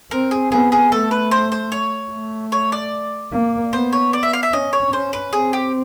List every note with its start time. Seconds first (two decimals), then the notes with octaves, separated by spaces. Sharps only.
0.11 C4 A#4
0.31 G#4
0.51 B3 G#4
0.72 G#4
0.92 A3 A4
1.11 B4
1.31 C5
1.52 C5
1.72 C#5
2.12 A3
2.52 C#5
2.72 D5
3.32 A#3
3.72 B3 C5
3.93 C#5
4.13 D5
4.23 E5
4.33 F5
4.43 E5
4.53 C#4 D#5
4.73 C#5
4.92 C#4 C5
5.13 B4
5.33 C4 G#4
5.53 G4